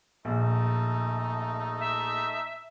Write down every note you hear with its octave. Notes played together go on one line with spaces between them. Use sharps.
A#1 A3 D#4
E5